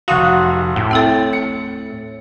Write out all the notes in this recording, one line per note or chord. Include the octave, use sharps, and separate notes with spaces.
F1 F#4 F5 F#5 C6 D#6 F#6
D#2 A2
C4 E4 A4 G5 A6
C#7